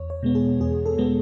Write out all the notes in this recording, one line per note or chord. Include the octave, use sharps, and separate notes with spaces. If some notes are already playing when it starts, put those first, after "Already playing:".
Already playing: E2 C#5
C#5
B2 G#3 B3
G#4
E2 G#4
A4
B2 G#3 B3